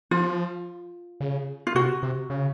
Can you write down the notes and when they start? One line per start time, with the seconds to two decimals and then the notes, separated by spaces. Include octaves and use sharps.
0.11 F3 F4
1.21 C#3
1.67 F4
1.75 C3 F#4
2.03 C3
2.30 C#3